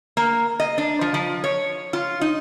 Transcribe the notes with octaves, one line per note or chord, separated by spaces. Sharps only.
A#3
D#5
D4
F3
F3
C#5
F4
D#4